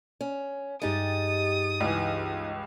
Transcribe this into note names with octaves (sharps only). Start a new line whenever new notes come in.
C#4
G2 G#3 D#4 G4 D#6 A6
C#2 E3